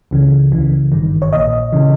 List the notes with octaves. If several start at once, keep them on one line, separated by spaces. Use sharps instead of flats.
C#2 C#3 E3
C#2 C#3 E3
G#1 G2 D#3
C#5
A#1 A#2 D#5
C#3 E3